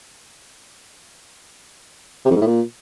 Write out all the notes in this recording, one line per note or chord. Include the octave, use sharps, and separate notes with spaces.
C3
F2
G#2
A2
A#2